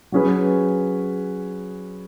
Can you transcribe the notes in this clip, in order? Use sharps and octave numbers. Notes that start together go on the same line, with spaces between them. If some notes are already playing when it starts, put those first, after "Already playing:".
F#3 C#4 G#4 B4